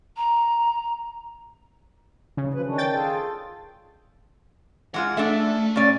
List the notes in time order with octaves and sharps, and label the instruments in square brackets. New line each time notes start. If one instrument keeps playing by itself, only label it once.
[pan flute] A#5
[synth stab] C#3
[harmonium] F3 F#3 B4
D#3 C#4 D4
[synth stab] G5 A6
[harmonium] F4 G#4 A4
[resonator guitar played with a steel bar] E3 G#3 F4 [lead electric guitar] F#5
[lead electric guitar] A3 [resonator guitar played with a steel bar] D4 A4 E5
[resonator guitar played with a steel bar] A#2 C#4 D5